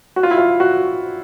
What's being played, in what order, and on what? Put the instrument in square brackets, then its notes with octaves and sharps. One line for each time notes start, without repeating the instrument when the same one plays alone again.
[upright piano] F#4
F4
E4
F4
F#4